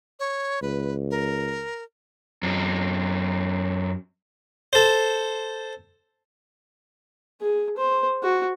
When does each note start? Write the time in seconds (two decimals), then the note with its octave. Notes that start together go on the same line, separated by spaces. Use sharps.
0.20 C#5
0.62 C#2 B4
1.11 A#4
2.43 F#2 C4
4.73 A4 C5
7.40 G#4
7.77 C5
8.23 F#4